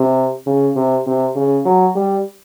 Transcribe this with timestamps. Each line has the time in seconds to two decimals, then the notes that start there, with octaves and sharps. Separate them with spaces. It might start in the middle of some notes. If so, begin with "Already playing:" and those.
Already playing: C3
0.46 C#3
0.76 C3
1.06 C3
1.36 C#3
1.65 F#3
1.95 G3